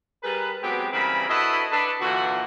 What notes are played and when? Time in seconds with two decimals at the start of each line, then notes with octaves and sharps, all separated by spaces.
0.23 G3 G#4 A#4 B4
0.62 F#3 G#3 B3 C4 G4
0.93 C#3 E3 G3 C4 A#4 B5
1.29 D4 E4 F#4 A4 B4 D#5
1.71 D4 A4 B4
2.01 A#2 D3 E3 F#4